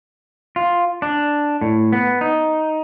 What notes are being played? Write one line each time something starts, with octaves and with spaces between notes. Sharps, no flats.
F4
D4
A2
B3
D#4